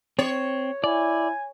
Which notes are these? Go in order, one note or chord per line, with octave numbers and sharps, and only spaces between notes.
C4 C#5
E4 D5 G#5